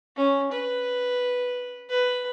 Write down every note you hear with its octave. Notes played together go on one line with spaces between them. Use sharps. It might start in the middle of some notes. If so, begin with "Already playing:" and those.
C#4
B4
B4